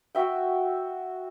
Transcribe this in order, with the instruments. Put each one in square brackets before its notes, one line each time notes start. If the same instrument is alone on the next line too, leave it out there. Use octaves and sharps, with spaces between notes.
[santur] F#4 E5 G5